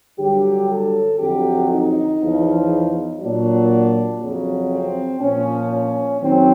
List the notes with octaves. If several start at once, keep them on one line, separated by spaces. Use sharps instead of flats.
G2 D3 F#3 G4
A4
F2 D3 F#3 G4
D#4
E2 C#3 F3
A#2 F#3 D4
F2 C#3 F#3
C4
A#2 F3 C#4
C#4
F#2 D#3 F#3 C4